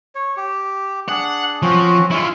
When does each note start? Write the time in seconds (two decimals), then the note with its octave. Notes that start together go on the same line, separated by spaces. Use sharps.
0.15 C#5
0.37 G4
1.09 D4 G#4 F#5
1.62 F3 C4 C#4 F#4
2.11 G#3 E4 F4 C#6